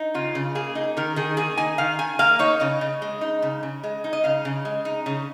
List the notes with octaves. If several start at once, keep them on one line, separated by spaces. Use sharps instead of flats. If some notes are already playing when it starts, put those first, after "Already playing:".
Already playing: D#4
C#3 F4
C#3
A#3 G#4
D#4
D#3 A#4
D#3 G#4
A#3 G#4
D#4 G#5
D#3 F5
D#3 G#5
A#3 F5
D#4 C#5
C#3 D#5
C#3
G#3
D#4
C#3
C#3
G#3
D#4
D#5
C#3 F5
C#3
G#3
D#4
C#3